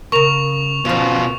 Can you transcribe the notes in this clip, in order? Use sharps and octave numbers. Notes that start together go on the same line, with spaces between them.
C#3 A#4 C#6 F7
B2 F3 C#4 F4